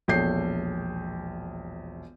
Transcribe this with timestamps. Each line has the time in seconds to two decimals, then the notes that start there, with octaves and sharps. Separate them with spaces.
0.08 E1 A#1 A4 C#5 G6 C7